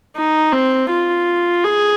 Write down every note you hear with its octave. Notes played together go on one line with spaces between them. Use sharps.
D#4
C4
F4
G#4